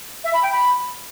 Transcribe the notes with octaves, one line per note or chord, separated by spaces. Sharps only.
E5
B5
G5
B5